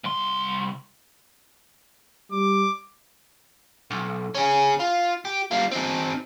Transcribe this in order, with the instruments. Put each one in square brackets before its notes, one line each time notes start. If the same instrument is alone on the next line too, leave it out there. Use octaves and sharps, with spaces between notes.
[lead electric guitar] C2 C6
[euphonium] G3 [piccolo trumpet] D6
[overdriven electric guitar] B1
C#4 G#4
F4
G4
G3 F4
C4 D#4